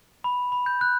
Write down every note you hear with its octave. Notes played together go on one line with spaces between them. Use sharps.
B5
B5
G6
F#6